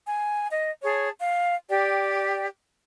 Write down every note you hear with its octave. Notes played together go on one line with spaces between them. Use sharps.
G#5
D#5
G#4 C#5 A5
F5
G4 D5 G5